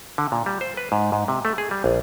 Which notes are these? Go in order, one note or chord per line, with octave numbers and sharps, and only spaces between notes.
D3
A#2
G3
C5
B4
G#2
G#2
C3
A3
G#4
G3
A#1